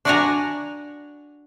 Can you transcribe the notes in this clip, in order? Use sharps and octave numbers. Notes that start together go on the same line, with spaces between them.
D4 F#4 D5 F#5 G#5 A#5